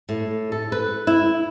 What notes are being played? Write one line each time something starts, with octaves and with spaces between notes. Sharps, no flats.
A2
A4
B4
E4